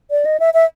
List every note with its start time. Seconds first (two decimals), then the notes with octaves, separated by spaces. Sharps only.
0.11 D5
0.25 D#5
0.40 E5
0.54 E5